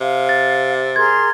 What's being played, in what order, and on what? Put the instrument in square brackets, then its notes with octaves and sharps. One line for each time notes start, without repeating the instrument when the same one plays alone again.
[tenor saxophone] C3 [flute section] F5
[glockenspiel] A6
[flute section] G#4 A#4 C6 [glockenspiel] G#6